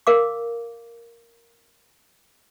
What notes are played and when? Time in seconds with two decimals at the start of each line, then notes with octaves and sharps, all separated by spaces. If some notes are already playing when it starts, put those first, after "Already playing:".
0.07 A#4 F5 D6